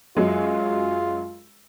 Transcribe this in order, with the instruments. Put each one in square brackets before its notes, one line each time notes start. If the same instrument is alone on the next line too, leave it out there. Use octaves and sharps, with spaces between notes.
[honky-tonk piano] F#2 F#3 G#3 [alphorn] F4